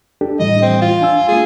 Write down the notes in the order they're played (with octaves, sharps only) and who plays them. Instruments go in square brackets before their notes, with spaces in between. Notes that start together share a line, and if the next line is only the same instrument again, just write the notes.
[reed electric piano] D4 G4 A4
[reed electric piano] A2 E3 G3 [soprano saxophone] D#5
[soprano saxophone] C4
F4
[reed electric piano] D4 G#5 E6
[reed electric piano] G#3 A#3 [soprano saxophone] G#4